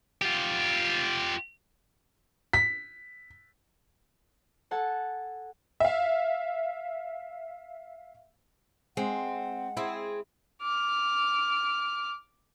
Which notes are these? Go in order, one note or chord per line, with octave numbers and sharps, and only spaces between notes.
F4 G4
B6
A4 F#5 G#5 A5
E5 F5
G#3 C4 F#5
C4 E4 G#4
D6 F6